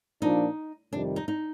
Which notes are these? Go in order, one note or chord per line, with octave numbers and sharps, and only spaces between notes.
A#2 F3 A#3 D4 D#4
F2 C3 D#3 G3 D4
D#4
D#4